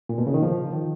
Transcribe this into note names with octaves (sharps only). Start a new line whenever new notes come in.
A#2
B2
C#3
D#3
F3
D#3